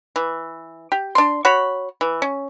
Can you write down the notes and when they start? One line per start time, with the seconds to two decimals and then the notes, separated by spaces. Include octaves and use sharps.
0.16 E3
0.92 G4
1.15 D4 C6
1.45 F#4 C#5 B5
2.01 E3
2.22 C#4